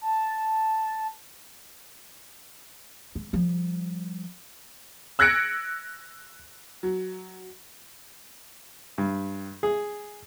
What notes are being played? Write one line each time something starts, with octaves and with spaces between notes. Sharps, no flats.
A5
G#3
F3 G3
E6 F#6 G#6 A#6 C#7 D7
F#3
G2
G#4